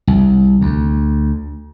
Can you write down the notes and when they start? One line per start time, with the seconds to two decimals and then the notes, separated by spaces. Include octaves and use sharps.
0.07 C2
0.61 D2